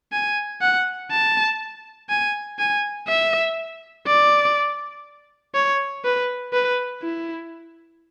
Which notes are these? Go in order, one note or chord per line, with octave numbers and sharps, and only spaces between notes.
G#5
F#5
A5
G#5
G#5
E5
D5
C#5
B4
B4
E4